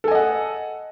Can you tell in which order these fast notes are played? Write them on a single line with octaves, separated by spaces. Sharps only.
A4 G#5 D#5 F#5